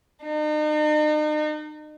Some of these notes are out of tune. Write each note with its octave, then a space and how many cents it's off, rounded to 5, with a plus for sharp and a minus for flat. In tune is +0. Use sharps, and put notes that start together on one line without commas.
D#4 -40